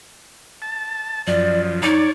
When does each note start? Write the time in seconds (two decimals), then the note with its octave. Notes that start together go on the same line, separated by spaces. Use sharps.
0.62 A5
1.27 F#2 F3 D5
1.83 D#4 C#5 D5